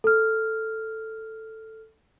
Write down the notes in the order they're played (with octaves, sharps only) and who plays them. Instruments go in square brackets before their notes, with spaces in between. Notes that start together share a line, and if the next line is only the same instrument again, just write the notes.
[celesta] A4 F6